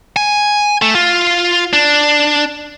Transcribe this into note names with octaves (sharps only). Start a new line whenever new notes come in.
G#5
A3
F4
D4